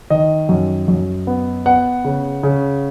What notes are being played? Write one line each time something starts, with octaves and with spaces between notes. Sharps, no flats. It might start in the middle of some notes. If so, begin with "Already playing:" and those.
D#3 D#5
F#2
F#2
B3
B3 F#5
C#3
C#3